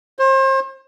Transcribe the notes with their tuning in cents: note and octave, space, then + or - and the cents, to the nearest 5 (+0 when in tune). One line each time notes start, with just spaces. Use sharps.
C5 +35